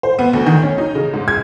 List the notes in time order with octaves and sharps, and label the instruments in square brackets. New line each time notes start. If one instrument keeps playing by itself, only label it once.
[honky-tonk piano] C5
B3
D2
D#3
C#4
D#4
C#3
G#2
G#6